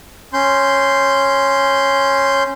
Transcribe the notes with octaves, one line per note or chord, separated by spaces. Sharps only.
C#4 C6 G6